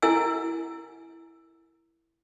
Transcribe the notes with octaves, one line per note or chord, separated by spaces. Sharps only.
E4 A#4 G#5 E6